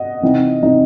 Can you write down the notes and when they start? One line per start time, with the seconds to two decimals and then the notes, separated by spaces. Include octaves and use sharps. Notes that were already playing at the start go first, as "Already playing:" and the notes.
Already playing: D#5 F#5
0.22 C3 E3 C4 D#4
0.61 C3 E3 C4 D#4